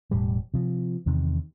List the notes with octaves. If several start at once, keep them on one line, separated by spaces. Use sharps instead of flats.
E1 A2 G3
C3 F3
E2 C3 D#3